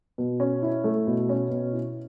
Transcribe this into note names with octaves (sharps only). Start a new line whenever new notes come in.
B2
C#4
E4
A3
B2
C#4
B2
E4